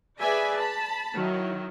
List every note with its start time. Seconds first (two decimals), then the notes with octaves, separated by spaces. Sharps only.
0.21 G#4 B4 D5 E5 G#5
0.57 A5 B5
1.14 D#3 F#3 E4